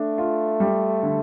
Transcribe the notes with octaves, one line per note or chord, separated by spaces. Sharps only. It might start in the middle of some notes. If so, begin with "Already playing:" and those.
Already playing: A3 D4
F4
G3
D3